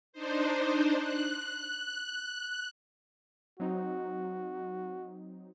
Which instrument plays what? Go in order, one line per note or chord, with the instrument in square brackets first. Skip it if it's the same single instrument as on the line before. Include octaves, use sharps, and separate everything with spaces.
[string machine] D4 D#4 C5
F#6
[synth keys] F#3 C4 D#4 [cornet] F#4